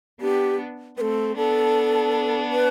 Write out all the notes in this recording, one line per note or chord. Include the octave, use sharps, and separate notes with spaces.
B3 D4 G4
A3 C4 A4 B4
B3 D4 A4
B4